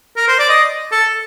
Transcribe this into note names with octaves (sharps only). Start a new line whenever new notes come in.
A#4
C5
D5
D#5
A4